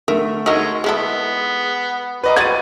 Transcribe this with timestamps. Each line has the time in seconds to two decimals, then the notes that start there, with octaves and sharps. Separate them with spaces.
0.08 D3 A3 A#4 E5
0.46 G#3 A3 D#4 F#4 A#4 C#5 E6
0.84 G#3 B3 E4 G#4 A4
2.24 G3 B4 D#5 A#5
2.36 F3 F#3 F#4 G#6 A6 D#7